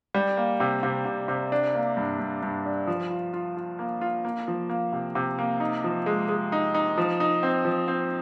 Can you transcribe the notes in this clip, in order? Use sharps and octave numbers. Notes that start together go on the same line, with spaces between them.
G3
A#3
C3
C3
C3
C3
D4
A#3
G2
G2
G2
D4
F3
F4
F4
F4
A#3
F4
A#3
F3
A#3
C3
C3
A#3
D#4
F3
G#3
G#3
D#4
D#4
F3
D#4
C4
F3
C4